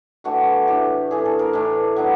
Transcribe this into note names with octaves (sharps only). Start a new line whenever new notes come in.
A2 E3 A3 D4 F#4
A2 E3 A3 D4 G4
A2 E3 A3 D4 G#4
A4
A#4
A2 E3 A3 D4
F#3 B3 D4